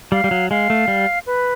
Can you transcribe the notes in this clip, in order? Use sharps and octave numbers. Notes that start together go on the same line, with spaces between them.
G3 F5
G3
F#3
G#3 F5
A3
G3
B4